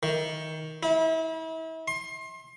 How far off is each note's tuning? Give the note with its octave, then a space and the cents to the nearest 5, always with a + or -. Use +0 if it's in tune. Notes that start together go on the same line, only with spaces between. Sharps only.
D#3 +20
E4 -35
C6 +30